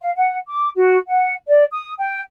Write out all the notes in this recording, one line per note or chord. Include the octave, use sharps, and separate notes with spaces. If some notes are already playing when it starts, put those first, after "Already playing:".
F5
F#5
D6
F#4
F#5
D5
D#6
G5